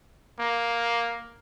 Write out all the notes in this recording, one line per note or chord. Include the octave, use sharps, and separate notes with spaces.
A#3